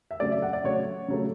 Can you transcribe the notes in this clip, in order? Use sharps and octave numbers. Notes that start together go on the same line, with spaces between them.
E5
C#3 F#3 A3 D5
E5
F#5
D5
C#3 F#3 A3 C#5
C#3 F#3 A3